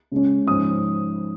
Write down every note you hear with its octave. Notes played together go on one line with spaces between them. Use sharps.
C#3 G#3 C#4
G#2 F3 C#4 D#6